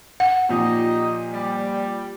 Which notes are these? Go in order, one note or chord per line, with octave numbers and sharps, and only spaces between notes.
F#5
A#2 F3 D#4 G4 D#5
G3